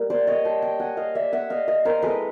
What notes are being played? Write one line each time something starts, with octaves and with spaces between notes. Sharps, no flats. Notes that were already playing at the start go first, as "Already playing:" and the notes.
Already playing: G3 A#3
C5 D5
C#5 D#5
G5 A5
G5 A5
F#5 G#5
D#5 F5
D5 E5
E5 F#5
D#5 F5
D#5 F5
A#4 C5
G#3 C4 E4 A4 B4